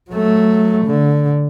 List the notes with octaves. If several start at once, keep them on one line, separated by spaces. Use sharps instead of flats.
F#3 A3
D3